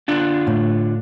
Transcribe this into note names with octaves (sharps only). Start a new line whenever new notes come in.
D3 D4 F4
A2